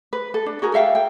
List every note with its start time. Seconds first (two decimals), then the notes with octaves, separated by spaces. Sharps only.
0.13 B4
0.34 A4
0.46 D4
0.62 F#4 G#4 A#4
0.74 A4 E5 F5 G5
0.95 G5